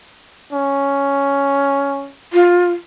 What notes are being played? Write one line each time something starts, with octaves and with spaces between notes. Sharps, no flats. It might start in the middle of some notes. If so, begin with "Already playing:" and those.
C#4
F4